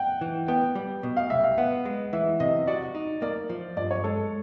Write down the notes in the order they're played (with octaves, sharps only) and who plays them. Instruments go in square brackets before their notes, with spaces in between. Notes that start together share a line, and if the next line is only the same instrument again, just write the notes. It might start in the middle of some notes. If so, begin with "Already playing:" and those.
Already playing: [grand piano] F#5 G5
[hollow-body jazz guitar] E3
[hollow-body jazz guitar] B3 [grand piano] G5
[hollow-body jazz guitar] G3
B2
[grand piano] F5
[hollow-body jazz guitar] C2 [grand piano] E5
[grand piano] F5
[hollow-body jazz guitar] B3 [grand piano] F#5
[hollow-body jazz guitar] G#3
[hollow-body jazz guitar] E3 [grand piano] E5
[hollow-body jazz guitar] C3 [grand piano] D#5
[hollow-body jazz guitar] F#4 [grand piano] D5
[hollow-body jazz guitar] D#4
[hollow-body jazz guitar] A#3 [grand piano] D5
[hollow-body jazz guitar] F3
[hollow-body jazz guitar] G2 [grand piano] D5
[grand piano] C#5
[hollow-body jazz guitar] G#3 [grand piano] A4